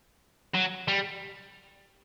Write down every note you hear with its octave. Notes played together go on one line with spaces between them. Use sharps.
F#3
G3